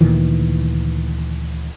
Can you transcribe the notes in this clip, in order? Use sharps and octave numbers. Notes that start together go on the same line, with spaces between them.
D2 A#2 D#3 E3